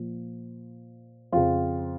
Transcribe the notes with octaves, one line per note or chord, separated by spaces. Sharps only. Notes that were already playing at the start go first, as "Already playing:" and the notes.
Already playing: A#2 F3
F2 C#3 F3 F4